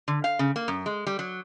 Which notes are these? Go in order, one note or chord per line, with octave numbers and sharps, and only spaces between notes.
D3
F5
C#3
A#3
F#2
G#3
G3
F#3